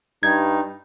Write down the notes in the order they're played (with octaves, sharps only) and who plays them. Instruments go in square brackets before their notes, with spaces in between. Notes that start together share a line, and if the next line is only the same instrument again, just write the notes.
[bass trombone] G2 [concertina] D#4 [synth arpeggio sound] G#6